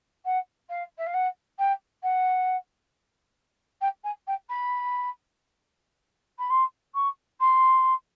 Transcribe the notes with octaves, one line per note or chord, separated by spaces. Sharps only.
F#5
F5
E5
F5
F#5
G5
F#5
G5
G#5
G5
B5
B5
C6
C#6
C6